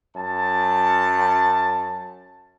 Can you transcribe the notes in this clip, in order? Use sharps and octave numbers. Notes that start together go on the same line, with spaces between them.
F#2 A5